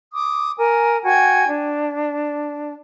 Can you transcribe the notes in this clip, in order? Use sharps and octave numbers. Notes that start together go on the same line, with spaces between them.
D6 D#6
A#4 G#5
F#4 G5 G#5 G#6
D4